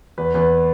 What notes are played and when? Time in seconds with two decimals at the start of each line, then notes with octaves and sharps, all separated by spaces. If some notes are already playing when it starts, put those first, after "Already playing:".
0.18 E2 B4
0.35 E2 B4